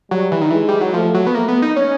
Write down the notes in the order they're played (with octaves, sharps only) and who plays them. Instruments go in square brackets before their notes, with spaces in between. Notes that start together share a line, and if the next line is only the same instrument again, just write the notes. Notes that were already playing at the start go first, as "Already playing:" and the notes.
[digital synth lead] F#3 [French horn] G3
[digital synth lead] E3
D#3
[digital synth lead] E3 [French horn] G#3
[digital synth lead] G3
F#3
[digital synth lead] F3 [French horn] A3
[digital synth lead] F#3
B3
[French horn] A3 [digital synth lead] A#3
[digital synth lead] B3
D#4
C#4